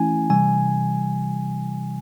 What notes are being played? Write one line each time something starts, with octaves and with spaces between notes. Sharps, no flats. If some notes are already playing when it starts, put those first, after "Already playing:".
Already playing: E3 A3 C#4 E4 G#5
C3 E3 G3 G#5